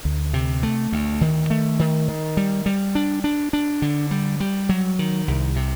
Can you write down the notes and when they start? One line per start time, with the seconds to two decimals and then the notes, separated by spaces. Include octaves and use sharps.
0.05 D2
0.34 C3
0.63 A3
0.92 D2
1.21 D#3
1.50 A3
1.79 D#3
2.08 D#3
2.37 G3
2.66 G3
2.95 D4
3.24 D4
3.53 D4
3.82 D3
4.11 G3
4.40 G3
4.69 F#3
4.99 D#3
5.28 C2
5.56 C3